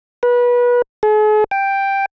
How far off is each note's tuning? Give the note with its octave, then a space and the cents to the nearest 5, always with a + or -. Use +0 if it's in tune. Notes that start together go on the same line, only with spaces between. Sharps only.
B4 -25
G#4 +45
G5 +5